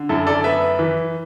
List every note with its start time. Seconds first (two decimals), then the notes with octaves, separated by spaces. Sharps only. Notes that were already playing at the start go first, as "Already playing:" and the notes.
Already playing: D3
0.09 F#2 E4 A4
0.27 A4 D5
0.44 B3 B4 E5
0.79 E3